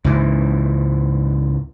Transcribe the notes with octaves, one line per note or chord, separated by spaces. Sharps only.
C#2 G#2 E3